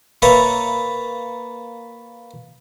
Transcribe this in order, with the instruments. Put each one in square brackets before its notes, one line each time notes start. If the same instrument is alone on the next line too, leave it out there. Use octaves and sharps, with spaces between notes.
[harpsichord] A#3 B4 C#5 E5 A5 A#5